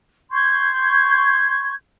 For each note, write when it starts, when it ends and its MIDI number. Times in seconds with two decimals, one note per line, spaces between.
0.31 1.73 84
0.31 1.73 85
0.31 1.73 91
0.31 1.73 92